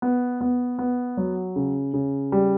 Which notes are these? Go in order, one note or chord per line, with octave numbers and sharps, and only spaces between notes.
B3
B3
B3
F#3
C#3
C#3
G3